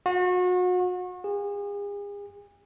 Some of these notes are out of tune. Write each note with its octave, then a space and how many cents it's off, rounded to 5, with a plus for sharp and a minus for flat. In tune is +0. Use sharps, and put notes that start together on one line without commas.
F#4 -35
G#4 -40